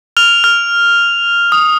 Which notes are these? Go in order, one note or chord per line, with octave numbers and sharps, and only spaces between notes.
F6 F7
F6
D#6